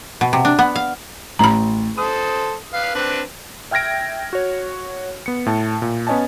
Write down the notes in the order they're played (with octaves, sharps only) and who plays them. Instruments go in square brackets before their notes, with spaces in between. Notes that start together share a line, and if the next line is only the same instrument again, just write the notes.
[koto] B2
C3
D4
B3
F5
[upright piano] A1 [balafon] A#5 B5
[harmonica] A4 C5 [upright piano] D#6
[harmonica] B4 F5
C4 D4 B4
[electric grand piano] E5 G5 F6 G#6 A#6 D7
F#4 C#5
B3 C#7
A2 A5
A#2
B3 C#4 C#5 D#5 G#5 A5